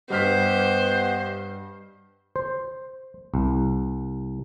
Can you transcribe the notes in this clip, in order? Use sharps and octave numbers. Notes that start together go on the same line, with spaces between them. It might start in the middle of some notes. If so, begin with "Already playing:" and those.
G2 B3 G4 C5 D#5 F#5 F6 B6
C5
C2